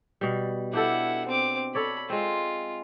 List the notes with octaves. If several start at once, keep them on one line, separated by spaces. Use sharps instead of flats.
B2 G3
D4 E4 G4 A4 F#5
C4 D6
A4 C#5 D5 B5
G#3 C4 F4